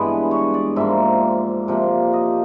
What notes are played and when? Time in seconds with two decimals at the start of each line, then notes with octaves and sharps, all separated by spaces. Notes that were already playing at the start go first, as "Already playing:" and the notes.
Already playing: G2 E3 G#3 B3 B4
0.31 C#5
0.54 D5
0.76 G#2 F3 A#3 E5
1.68 C3 F3 A#3
2.13 D#5